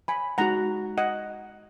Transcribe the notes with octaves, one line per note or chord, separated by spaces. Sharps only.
G#5 B5
G#3 D#4 F#4 F#5 A#5
D#5 F#5